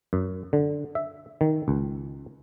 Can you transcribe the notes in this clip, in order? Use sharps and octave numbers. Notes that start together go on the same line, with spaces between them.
F#2
D3
E5
D#3
C#2